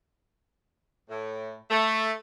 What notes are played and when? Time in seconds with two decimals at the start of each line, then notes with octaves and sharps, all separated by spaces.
1.09 A2
1.70 A3